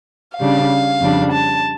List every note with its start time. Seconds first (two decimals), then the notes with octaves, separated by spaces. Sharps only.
0.38 C#3 G3 D4 F5
1.01 F2 C#3 G3 D4
1.33 A5